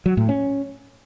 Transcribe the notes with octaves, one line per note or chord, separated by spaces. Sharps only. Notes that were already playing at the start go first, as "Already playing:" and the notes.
F#3
A2
C#4